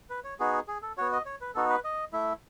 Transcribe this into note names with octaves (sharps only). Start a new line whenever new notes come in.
B4
C#5
B3 D#4 F#4 G#4
G#4
A4
B3 F#4 C#5
D#5
C#5
B4
B3 D#4 F#4 A4
B4
D#5
A3 E4 E5